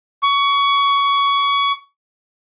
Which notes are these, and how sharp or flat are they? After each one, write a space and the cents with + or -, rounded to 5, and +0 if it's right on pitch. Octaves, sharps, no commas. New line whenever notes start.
C#6 +25